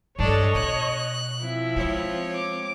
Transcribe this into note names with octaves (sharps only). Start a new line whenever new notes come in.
G2 G3 D4 A4 C#5 D#5
B2 F#6
F3 C4 E4
G#3 C#5
D6